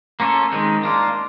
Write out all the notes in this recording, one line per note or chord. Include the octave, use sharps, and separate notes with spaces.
A#3 C#4 F4 A4 C#5
D#3 G#3 C4
A#3 D4 F4